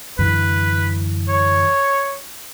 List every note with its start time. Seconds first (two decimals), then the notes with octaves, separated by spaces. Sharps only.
0.19 F#2 D3 E3 B4
1.29 C#5